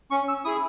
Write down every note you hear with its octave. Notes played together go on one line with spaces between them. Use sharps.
C#4 C#6
E6
E4 G#4 D#6